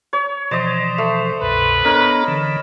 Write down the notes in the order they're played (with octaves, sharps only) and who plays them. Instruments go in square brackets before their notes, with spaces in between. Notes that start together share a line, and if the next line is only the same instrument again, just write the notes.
[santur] C#5
[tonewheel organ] B2 E3 F3 [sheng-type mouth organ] C5 [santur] D5 D#5
[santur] A3
[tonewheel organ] C2 F#2 B2 [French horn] B4
[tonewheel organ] B3 D4 A4 [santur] A#4 [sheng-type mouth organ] C#5 D#5 B5
[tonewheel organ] D3 E3